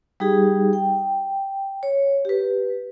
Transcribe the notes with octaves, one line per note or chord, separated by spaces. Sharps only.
G3 D#4 G4 G#4
G5
C#5
G4 B4